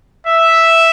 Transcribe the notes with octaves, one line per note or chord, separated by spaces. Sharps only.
E5